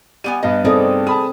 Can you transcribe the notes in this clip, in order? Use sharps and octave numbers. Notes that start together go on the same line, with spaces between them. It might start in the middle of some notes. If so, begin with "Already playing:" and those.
G3 B3 G#5 D#7
G2 B3 D#5
C4 D#4 G#4 A4 D5
G#4 A5 B5 D#6